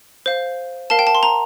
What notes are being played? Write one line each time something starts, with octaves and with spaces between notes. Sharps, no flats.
C5 F5
A#4 F5 A5
G5
A5
C6
A#5